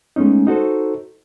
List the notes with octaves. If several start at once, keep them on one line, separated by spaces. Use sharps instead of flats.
G#3 A3 B3 C#4 D#4
D#4 F#4 A4 C5